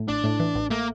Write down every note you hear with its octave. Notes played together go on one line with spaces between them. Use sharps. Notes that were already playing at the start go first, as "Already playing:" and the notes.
Already playing: A2
A1 D4
A2
E3
A1
A3 A#3